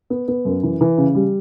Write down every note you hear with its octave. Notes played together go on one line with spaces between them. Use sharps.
B3
B3
F#2
E3
E3
C#3
G3